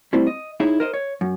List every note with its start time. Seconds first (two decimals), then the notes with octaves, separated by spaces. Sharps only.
0.13 G3 A3 C4 E4
0.27 D#5
0.60 D#4 E4 G#4 C#5 E5
0.80 A#4 C5 D#5
0.94 C#5
1.21 F#2